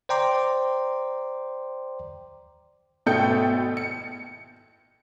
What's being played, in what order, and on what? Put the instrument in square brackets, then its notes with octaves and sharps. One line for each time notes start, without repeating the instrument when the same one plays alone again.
[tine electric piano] C5 D5 G5 A#5 C6 D6
[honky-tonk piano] G#1 B2 A3 G5 G6 C#7
C#7